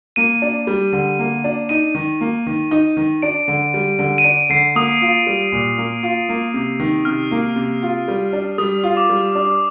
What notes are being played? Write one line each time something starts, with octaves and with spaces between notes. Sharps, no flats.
A#3 D#7
D4
G3
D3
A#3
D4
D#4 D#7
D#3
A#3
D#3
D#4
D#3
D4 D7
D3
G3
D3
D#7
D4 D7
D3 C7
A#3 D#6
F4
G3
A#2
A#3
F4
A#3
C3
D#3
C3 F6
A#3
C3
F4
G3
D4
G3 D#6
F4
D6
G3
D4